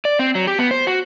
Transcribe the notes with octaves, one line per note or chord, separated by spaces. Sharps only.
D5
C4
F#3
G4
B3
C5
F#4